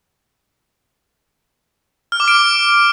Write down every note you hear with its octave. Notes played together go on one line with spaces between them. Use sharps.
F6
D6
D7